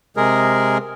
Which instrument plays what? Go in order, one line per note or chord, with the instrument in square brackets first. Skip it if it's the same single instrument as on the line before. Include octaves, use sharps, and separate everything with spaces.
[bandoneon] C3 G#3 G#4 A#4